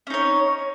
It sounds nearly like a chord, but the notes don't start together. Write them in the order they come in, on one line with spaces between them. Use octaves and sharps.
C#4 D#4 C#5